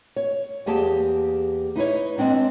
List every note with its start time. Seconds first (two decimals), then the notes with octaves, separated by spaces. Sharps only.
0.16 C#5
0.66 E2 A#3 G4 G#4 A5
1.75 D#4 E4 B4 C#5
2.18 G#3 B3 C4 D4